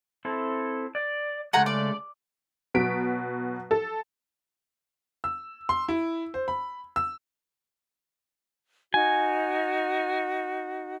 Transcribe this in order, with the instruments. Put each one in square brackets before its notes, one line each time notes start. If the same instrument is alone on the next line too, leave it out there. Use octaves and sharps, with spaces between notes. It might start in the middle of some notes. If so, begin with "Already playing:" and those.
[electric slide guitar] C4 E4 A4
D5
[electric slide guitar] C#3 G#3 A3 [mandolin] F#5 G#5 A#5
[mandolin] D5
[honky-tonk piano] B2 F#3 B6 D7
A4
[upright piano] E6
C6
E4
C5
B5
E6
[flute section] D#4 F#4 [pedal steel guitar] G#5